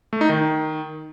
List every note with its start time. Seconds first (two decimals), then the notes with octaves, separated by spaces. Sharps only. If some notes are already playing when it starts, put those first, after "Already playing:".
0.13 A3
0.21 D#4
0.29 D#3